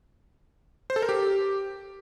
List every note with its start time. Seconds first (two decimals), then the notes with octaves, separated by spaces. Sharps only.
0.90 C5
0.96 A4
1.02 A#4
1.09 G4